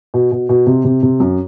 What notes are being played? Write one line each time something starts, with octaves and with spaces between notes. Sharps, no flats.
B2
B2
B2
C3
C3
C3
F#2